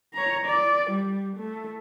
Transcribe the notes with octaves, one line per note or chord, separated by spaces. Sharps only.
C#5 A#5
D5
G3
A3